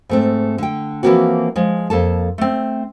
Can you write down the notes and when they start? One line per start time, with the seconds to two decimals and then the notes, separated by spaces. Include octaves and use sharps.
0.09 G#2 A3 C4
0.58 D3 G5
1.03 E3 F3 A3 A#3 C4 F#4
1.56 F3 G#3
1.90 F2 A#3 A4 A5
2.38 A3 C4